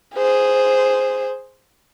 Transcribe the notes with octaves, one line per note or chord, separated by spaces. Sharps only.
G#4 C5